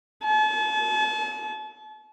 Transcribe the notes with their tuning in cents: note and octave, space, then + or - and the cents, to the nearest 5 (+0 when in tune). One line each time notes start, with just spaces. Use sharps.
A5 -40